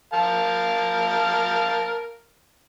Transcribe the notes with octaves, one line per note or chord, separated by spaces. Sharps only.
A#4 F5 A5